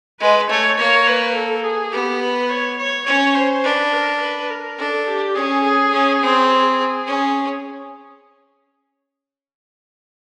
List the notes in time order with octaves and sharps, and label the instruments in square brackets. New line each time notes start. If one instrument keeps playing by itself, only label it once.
[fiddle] G#3 [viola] B4
[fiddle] A3 [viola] C#5
[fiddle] A#3 [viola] C#5
[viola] B4
A4
G#4
[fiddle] B3 [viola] G4
[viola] B4
C#5
C#5
[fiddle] C#4 [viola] C#5
[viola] C5
[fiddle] D4 [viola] B4
[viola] A#4
B4
A#4
[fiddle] D4 [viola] A4
[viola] G4
[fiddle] C#4 [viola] G#4
[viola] G#4
[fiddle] C#4
C4
[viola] G#4
[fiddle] C#4